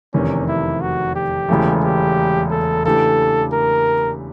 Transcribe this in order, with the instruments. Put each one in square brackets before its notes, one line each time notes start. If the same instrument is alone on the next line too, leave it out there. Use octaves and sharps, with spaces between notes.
[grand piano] F1 E2 C3 D#3 [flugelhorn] C#4
[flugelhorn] E4
F#4
G4
[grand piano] E1 E2 C#3 E3 A3
[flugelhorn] G4
A4
[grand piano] C#3 E3 A3 D4 G4 [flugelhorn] A4
[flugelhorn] A#4